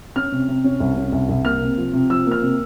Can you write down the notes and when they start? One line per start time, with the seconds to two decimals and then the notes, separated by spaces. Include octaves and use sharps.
0.16 C#4 F6
0.32 C3
0.48 C3
0.64 C#4
0.80 C2
0.97 C#4
1.12 C2
1.29 C2
1.45 A#3 F6
1.61 C3
1.78 F3
1.93 C3
2.10 F3 E6
2.26 A#3
2.31 F6
2.42 C3